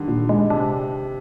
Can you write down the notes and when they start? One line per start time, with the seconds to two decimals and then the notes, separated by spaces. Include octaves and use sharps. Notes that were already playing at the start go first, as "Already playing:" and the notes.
Already playing: D3 D#3 G3
0.08 A#2
0.29 G#3
0.50 C3 D4